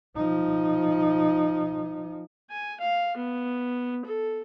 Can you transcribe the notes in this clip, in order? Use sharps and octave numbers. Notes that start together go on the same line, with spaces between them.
F3 D#4
G#5
F5
B3
A4